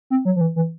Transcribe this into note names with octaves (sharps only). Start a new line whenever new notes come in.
C4
F#3
F3
E3
E3